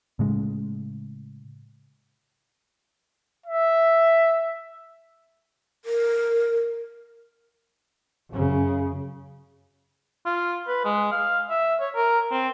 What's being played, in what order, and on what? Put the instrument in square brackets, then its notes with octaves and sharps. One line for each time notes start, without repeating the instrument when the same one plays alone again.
[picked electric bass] A2 C#3 G#3
[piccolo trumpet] E5
[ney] A#4
[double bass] F#2 C#3
[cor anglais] F4
B4
G#3
F5
E5
C#5
A#4
C4